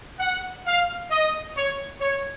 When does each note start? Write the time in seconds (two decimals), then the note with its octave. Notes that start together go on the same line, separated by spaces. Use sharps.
0.20 F#5
0.64 F5
1.10 D#5
1.55 C#5
2.00 C#5